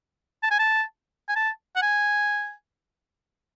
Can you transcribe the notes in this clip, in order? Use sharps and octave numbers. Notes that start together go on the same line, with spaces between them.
A5
G#5
A5
G#5
A5
F#5
G#5